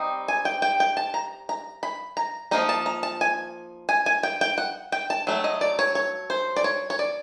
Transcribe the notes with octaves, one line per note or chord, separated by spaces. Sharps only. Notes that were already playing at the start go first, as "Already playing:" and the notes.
Already playing: G3 C4 D#4
G#5
G5
G5
G5
A5
A#5
A#5
B5
A#5
F3 A#3 D#4 A#5
A5
A#5
A5
G#5
G#5
G#5
G5
G5
F#5
G5
A5
F#3 A3
D#5
D5
C#5
C#5
C5
D5
C#5
C#5
D5